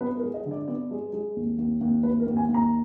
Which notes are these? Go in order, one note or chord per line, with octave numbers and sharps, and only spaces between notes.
B3 B4
A#4
G#3
D#5
D3
D5
B3 D5
G#3
G#3
D#2
D#2
D#2
D#2 B4
A#4
D#2
G#5
D#2
A#5